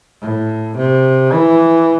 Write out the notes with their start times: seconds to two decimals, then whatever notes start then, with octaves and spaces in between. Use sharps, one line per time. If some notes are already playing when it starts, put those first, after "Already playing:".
0.21 A2
0.76 C3
1.34 E3